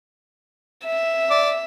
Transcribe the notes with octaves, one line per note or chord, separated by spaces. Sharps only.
E5
D5